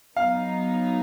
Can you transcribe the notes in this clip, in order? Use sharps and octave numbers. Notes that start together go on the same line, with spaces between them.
F#3 B3 D#4 F5